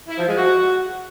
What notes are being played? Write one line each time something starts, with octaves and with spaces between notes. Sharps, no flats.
E4
F3
G#3
F#4